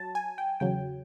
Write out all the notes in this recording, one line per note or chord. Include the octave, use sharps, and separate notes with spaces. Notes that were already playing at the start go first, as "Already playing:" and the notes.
Already playing: F#3 A5
G#5
G5
E2 C#3 F#3 G5